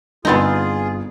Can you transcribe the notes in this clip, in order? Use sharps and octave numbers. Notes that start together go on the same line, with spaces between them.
G1 B3 C4 D#4 F4 G#4 A6